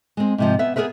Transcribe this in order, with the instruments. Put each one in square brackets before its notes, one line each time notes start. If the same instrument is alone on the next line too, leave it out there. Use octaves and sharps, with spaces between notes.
[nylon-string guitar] G#3 C4
G#2 C3 F3
B3 E5
B3 G#4 A#4 B4 E5